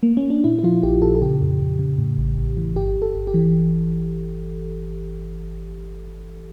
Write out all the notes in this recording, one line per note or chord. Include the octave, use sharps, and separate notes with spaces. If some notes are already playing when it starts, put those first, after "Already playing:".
A#3
C#4
D4
A#2 E4
E4
F3 F4
A#1 G4
A#2 A4
A4
C#3 G4
F2
F2
C#3
A2
A1
A1
E3
G1 G4
G1
A4
G1
G4
E3